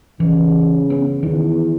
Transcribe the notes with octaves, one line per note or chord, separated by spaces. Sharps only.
C#3 E3
B3 C#4
E2 D#3